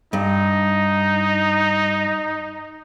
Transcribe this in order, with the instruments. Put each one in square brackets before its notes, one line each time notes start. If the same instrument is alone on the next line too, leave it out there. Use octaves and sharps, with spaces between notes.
[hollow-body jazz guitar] G2 [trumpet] D#4